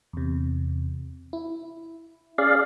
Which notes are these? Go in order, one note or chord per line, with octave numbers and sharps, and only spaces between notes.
E2 C3
E4
C#4 G#4 D5 F5